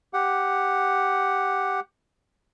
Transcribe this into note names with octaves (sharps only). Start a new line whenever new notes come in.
G4 F#5